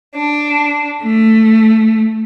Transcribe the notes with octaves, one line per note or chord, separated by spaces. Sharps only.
D4
A3